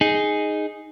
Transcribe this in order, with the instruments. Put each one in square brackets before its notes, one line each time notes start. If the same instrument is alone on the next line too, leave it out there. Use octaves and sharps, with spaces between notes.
[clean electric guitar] D#4 G#4